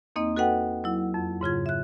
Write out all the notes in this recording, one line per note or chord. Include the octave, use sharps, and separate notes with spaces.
E2 A#3 C4 D#4 D#5
F#4 A4 B4 D#5 F#5 G5
F#3 E4
F2
G#2 C#3 F4 G#6
E5 F#6